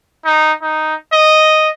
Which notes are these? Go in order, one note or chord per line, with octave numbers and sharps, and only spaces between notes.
D#4
D#4
D#5